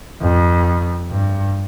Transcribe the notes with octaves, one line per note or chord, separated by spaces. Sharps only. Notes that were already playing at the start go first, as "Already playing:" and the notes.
F2
G2